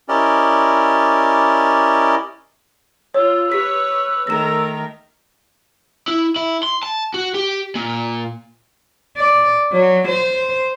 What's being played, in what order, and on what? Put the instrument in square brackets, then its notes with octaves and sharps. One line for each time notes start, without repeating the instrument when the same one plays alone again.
[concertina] C#4 E4 G4 A#4 D5 D#5
[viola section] F4 [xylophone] C#5 [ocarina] E6
[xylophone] G4 B6 [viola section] B4 C#5
[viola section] D#3 A3 A#4 [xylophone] A#6 E7
[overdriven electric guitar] E4
E4
C6
A5
F#4
G4
A#2
[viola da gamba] D5
F#3
C5